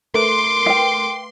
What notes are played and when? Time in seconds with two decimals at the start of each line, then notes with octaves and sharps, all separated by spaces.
0.14 A3 A#4 B4 C6 D6
0.66 F5 G5